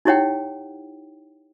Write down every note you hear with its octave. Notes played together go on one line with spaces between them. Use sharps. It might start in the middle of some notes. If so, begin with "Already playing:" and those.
D#4 E4 G4 C#5 F#5 G5